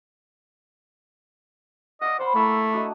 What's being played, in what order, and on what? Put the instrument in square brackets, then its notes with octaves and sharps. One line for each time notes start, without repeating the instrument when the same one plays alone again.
[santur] D5 F5 F#5 [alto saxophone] D#5
[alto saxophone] C5 [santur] F#5 B5
[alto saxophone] A3 [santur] A#3 E4 E6
[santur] D4 F#4 D#5